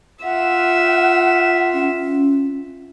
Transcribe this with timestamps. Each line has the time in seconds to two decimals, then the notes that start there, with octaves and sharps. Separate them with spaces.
0.24 F4 E5 F#5
1.74 C#4